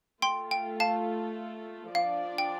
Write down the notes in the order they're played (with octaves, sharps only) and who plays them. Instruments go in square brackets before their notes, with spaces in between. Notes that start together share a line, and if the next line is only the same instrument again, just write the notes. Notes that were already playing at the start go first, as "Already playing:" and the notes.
[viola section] A3 F4 A4 [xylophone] G5 C6
[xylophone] G5
F5 A5
[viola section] F3 D4 F4 D5 [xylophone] F5
[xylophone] G5